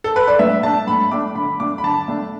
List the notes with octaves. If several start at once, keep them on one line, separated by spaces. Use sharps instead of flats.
A4
B4
D5
A2 E5
A3 D4 A5
A2 B5
A3 D4 D6
D3 B5
A3 D4 D6
B5
D3 A5
A3 D4